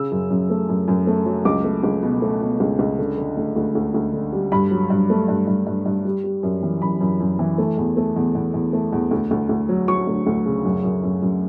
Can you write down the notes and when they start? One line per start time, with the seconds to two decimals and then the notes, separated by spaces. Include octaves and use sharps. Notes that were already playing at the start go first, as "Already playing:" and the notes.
Already playing: C#3 E6
0.11 F#2
0.30 F#2
0.50 A3
0.69 F#2
0.88 F#2
1.07 A3
1.26 F#3
1.45 C#2 D6
1.64 A3
1.84 C#2
2.03 B2
2.22 A3
2.41 B2
2.60 C#2
2.79 C#2
2.98 D3
3.18 D3
3.37 D2
3.56 D2
3.75 D2
3.94 D2
4.13 D3
4.32 G3
4.52 G2 B5
4.71 F#3
4.90 G2
5.10 A3
5.28 G2
5.47 G2
5.67 G2
5.86 G2
6.05 G3
6.24 G3
6.43 F#2
6.63 E3
6.82 F#2 B5
7.01 F#2
7.20 F#2
7.39 E3
7.58 A3
7.78 E2
7.97 A3
8.16 E2
8.35 E2
8.54 E2
8.73 A3
8.92 E2
9.11 D2
9.31 D2
9.49 D2
9.69 F#3
9.88 F#3 C#6
10.07 D2
10.27 D2
10.46 C#3
10.65 F#2
10.84 F#2
11.03 F#2
11.22 F#2